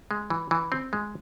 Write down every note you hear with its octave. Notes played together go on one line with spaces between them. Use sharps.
G#3
E3
E3
C4
G#3